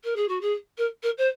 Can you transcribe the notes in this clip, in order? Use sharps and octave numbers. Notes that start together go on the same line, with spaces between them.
A#4
G#4
F#4
G#4
A#4
A#4
C5